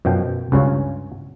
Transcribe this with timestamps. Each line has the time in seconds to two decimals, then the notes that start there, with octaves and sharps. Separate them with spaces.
0.05 F#2 B2 F3 G5
0.52 C#2 G2 C#3 C#4 F4 C#5